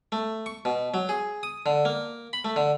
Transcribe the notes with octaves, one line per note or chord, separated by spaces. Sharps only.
A3
C#6
B2
F#3
G#4
D#6
D3
A#3
B5
A3
D3